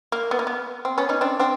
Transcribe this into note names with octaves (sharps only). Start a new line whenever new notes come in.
A#3
B3
A#3
B3
C4
B3 C#4
C#4 D#4
C4 D4
C4 D4